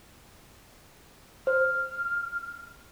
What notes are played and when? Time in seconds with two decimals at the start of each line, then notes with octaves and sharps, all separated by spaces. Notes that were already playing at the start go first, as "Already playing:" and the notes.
1.47 C5 F6